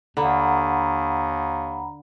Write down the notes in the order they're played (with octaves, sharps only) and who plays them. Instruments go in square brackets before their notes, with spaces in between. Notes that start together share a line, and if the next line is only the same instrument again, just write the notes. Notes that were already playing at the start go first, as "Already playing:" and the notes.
[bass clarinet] D#2 [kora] D3 [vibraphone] F#5 A#5 B5